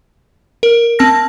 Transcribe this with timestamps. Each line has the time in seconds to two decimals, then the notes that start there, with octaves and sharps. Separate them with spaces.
0.63 A#4
0.99 C4 A5 F6 A#6